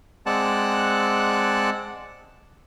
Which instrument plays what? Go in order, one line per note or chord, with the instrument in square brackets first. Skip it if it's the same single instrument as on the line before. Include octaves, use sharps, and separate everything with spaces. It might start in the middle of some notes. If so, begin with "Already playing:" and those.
[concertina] G#3 C4 D5 F#5 A5 F#6